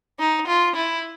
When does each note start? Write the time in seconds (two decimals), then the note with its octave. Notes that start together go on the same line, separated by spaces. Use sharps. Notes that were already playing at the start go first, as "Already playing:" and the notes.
0.19 D#4
0.48 F4
0.76 E4